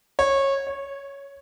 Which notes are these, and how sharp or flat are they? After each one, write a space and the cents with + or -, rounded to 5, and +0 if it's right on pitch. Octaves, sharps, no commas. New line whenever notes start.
C#5 -20
C#5 +5